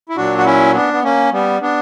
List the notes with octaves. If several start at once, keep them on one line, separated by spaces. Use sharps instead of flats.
E4
A#2 F#3 D4 F#4
F#4
C#4 E4
B3 D4
B3
A#3 C#4
G3 B3
B3 D4